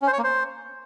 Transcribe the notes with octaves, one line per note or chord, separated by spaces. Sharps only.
C#4
C5
C#5
A#3
C5